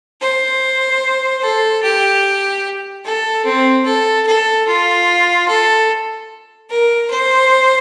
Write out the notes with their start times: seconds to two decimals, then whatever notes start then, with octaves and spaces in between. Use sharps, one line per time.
0.21 C5
1.42 A4
1.83 G4
3.05 A4
3.45 C4
3.86 A4
4.27 A4
4.67 F4
5.48 A4
6.70 A#4
7.10 C5